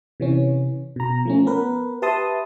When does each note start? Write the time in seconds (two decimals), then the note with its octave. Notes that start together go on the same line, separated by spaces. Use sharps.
0.20 C3 E3 C#4
0.96 B2 A#5
1.25 F3 A3 C#4
1.46 B3 A#4 B4
2.02 G4 B4 E5 A5 C6 D#6